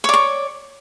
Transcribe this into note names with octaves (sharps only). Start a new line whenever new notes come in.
C#5 D5 C#6